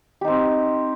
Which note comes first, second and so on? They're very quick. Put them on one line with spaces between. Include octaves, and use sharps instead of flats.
G4 D#4 C4